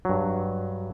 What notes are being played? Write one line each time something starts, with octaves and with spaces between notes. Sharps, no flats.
G2 F#3